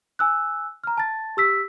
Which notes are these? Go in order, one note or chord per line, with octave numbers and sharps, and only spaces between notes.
G#5 E6 F#6
A#5 F6
A5 A6
G4 E6 B6